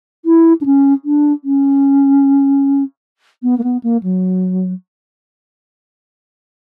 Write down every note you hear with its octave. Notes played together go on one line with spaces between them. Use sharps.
E4
D4
C#4
D4
C#4
B3
A#3
B3
A#3
F#3